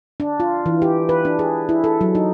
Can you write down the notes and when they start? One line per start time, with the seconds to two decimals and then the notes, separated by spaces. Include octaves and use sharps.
0.20 D4
0.40 F4
0.66 E3
0.82 G4
1.09 B4
1.25 D4
1.39 G#4
1.69 E4
1.84 A4
2.01 F#3
2.15 D#4